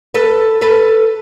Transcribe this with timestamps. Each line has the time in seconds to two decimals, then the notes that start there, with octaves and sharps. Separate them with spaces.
0.14 A4 B4
0.61 A4 B4